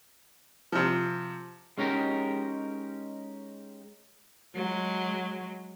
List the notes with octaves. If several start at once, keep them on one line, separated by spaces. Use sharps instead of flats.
C3 F3
G#3 C#4 D#4 G4 A#4
F#3 G#3